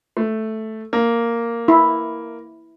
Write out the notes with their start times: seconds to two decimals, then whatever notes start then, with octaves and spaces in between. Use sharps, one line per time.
0.17 A3
0.93 A#3
1.68 E4